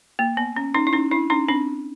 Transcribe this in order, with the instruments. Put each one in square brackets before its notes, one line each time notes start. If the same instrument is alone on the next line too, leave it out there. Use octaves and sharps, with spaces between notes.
[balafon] A#3
B3
C#4
C#4 D#4
E4
C#4 D#4
D4 E4
C#4 D#4
C4 D4